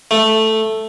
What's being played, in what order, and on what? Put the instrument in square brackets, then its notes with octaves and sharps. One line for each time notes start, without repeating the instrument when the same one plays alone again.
[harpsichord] A3